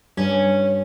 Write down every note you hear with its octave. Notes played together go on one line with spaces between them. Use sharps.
G2 C#4